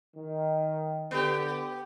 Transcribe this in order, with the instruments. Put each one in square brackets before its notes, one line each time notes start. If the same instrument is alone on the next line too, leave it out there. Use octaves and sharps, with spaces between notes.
[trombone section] D#3
[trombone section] D3 [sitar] B3 G4